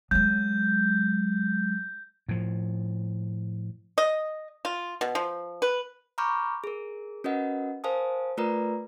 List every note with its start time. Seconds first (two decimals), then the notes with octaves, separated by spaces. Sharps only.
0.11 F#3 G#3 G6
2.29 A2 F3
3.98 D#5
4.65 F4
5.01 B2
5.15 F3
5.62 B4
6.18 A#5 B5 C#6 D6 F6 G6
6.64 G#4 A#4
7.24 C#4 F#4 A#4 B4 D#5 F#5
7.84 A#4 C5 F5 G#5 A5 D#6
8.37 A3 F4 A#4 B4 D5 A#5